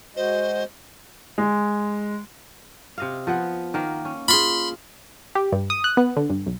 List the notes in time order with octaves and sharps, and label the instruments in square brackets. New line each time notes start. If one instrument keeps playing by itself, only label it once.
[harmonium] G#3 F#4 D#5 [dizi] C5
[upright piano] G#3
[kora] C3 D#5 F5
F3 B3 F#5
D#3 A#3
C#4
[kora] F4 G#4 [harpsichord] B5 C6
[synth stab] G4
G2
D#6
F#6
B3
D3
G2
B1